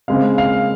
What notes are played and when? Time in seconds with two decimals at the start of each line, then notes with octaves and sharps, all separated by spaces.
0.08 C#3 G#3 C4 F5
0.38 F5